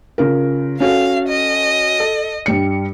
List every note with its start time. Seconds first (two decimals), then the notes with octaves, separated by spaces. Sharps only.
0.18 C#3 F4 A#4
0.80 C#4 F#4 A4 F5
1.28 D#5
2.00 A4
2.46 G2 G3 C#7